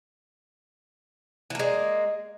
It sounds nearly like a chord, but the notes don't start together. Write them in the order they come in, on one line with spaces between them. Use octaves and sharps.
E3 A#3 G#3